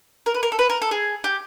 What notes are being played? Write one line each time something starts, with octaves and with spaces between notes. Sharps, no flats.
A#4
B4
A#4
A4
B4
A#4
A4
G#4
G4